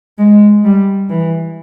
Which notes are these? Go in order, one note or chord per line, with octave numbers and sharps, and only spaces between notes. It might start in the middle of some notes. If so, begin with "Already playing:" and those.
G#3
G3
E3